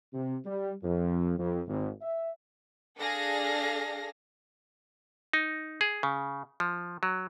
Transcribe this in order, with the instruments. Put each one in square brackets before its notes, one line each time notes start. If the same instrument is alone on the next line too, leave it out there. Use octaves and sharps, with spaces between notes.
[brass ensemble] C3
G3
F2
F2
G#1
E5
[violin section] D4 G#4 A4 F5 A#6
[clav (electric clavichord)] D#4
G#4
C#3
F3
F#3